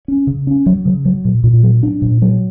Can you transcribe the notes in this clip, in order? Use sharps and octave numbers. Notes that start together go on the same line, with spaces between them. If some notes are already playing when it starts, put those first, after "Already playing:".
C#4
C#3
C#4
F#3
C#3
F#3
A#2
A#2
F#3
D4
A#2
F#3